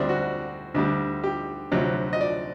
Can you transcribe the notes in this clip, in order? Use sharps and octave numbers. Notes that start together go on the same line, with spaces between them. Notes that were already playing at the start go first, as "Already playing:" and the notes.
Already playing: D2 D3 G3 C4 D4
F#4
D2 D3 G3
G4
D2 C3 F#3
D#5
D5